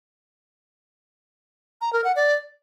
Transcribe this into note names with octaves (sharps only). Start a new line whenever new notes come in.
A#5
A#4
F#5
D5